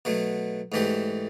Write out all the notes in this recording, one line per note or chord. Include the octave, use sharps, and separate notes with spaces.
B2 F#3 A3
G#2 E3 A3 D4 G4